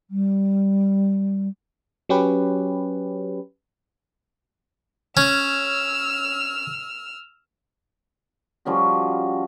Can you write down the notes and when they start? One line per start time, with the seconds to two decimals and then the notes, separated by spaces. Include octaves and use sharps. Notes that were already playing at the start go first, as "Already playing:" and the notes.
0.10 G3
2.09 F#3 C#4 G4 B4
5.17 C#4 E6 F6
8.65 F3 G3 C#4 F#4